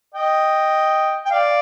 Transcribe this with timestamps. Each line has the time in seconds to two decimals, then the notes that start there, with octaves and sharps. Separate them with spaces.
0.14 D#5 G5
1.26 G5
1.31 D5 F5